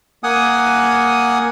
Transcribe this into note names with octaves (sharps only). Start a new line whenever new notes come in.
A#3 F#5 G#5 D#6